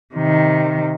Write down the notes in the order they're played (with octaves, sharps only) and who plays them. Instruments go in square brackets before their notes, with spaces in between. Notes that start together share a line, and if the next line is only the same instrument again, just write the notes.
[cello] C3 D#3